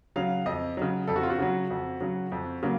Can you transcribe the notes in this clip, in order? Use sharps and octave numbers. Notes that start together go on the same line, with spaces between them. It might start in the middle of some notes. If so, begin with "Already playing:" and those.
C#3 F#3 F5
F2 D#5
C#3 F#3
F2 A4
F#4
F4
F#4
C#3 F#3
F2
C#3 F#3
F2
C#3 F#3 A#3